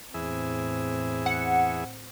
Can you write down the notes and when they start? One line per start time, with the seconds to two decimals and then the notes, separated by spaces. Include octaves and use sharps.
0.14 E2 A2 C4 G#4 E5
1.26 F#5 C#7